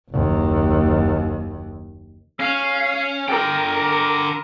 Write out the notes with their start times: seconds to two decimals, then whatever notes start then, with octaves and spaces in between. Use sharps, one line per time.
0.11 F#1 D#2
2.40 C#4 F5
3.29 D3 A#4 G5